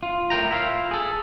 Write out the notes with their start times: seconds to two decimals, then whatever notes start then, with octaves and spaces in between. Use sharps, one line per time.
0.03 F4
0.30 A2 A#4 G5 A#5
0.51 E4 F4 F5
0.91 G#4 A4